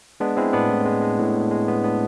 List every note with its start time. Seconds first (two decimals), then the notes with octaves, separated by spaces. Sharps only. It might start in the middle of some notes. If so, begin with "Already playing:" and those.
0.20 G#3 B3 D4
0.37 G#3 C4 E4
0.53 A2 B3 D4
0.70 A2
0.85 G#3
1.02 G#3
1.19 A2
1.35 A2
1.51 G#3
1.68 G#3 B3
1.84 A2 B3 D4